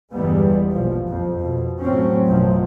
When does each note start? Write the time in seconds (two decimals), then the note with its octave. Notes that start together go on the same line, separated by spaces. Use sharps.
0.11 G1 E2 E3 G3 G#3 B3
0.71 A#1 B2 F3
1.09 F2
1.44 B2
1.80 A2 F#3 C4 C#4
2.25 A1 F#2 B2 F3 F#3